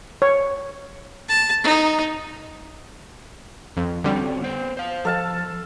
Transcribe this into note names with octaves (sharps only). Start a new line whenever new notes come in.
C#5
A5
D#4
F2
D3 G3 C4 C#4 F#4
B3 C5
C5 F5
F3 A4 F5 A5